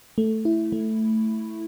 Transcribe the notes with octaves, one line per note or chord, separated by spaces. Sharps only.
A3
E4
A3